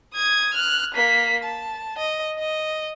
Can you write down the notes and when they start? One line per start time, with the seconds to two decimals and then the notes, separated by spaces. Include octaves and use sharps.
0.14 D#6 G#6
0.54 F6 F#6
0.94 A#3 B6
1.43 A5
1.98 D#5
2.39 D#5